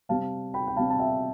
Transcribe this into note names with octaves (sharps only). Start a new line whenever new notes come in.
C3 G3 C4 F5 A5
G5 B5
G5
C3 G3 C4 F5 A5
A5
E5 G5